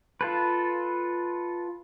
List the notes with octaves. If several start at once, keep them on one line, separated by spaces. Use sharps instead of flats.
F4 A4 B4